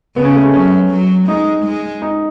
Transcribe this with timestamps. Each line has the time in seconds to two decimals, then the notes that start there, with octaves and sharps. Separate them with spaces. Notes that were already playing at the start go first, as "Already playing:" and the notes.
0.16 C#3 B3
0.25 C#4
0.35 A3
0.43 G#3
0.54 F#3 C#4
0.90 F#3
1.27 G#3 D#4
1.65 G#3
2.02 D#4